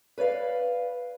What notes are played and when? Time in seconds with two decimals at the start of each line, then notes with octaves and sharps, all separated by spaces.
0.18 B4 C#5 D5 F5